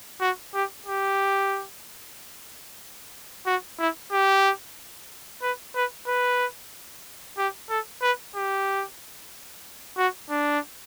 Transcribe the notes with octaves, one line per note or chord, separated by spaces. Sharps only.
F#4
G4
G4
F#4
E4
G4
B4
B4
B4
G4
A4
B4
G4
F#4
D4